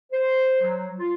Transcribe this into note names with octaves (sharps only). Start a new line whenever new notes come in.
C5
F#3
F4